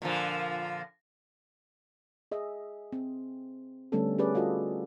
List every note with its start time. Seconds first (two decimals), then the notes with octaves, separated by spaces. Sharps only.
0.02 A#2 D3 F3
2.31 G#4 D#5 E5
2.92 C4
3.92 D3 G3 A3 B3 C#4 A4
4.18 C#4 G4 G#4 B4 D5
4.35 F4 F#4 A4 D#5